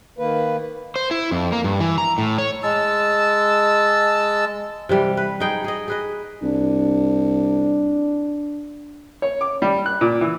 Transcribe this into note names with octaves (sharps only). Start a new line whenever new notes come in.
D#3 A#3 B4
C5
E4
F2
A#3
G2
E3
A#5
A2
C#5
G#3 A5 E6
C3 E3 G3
B4
D#4 G#4 G5
G#4 D#5
G#4 B4 D#5
C2 D4
C#5
D6
G3
F#6
A#2
E3